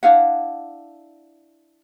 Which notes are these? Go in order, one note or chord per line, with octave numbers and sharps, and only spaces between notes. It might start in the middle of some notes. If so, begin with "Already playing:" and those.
D4 E4 F5 F#5